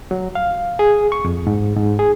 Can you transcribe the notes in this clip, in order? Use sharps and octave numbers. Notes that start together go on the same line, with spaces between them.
F#3
F5
G#4
C#6
F2
G#2
G#2
G#4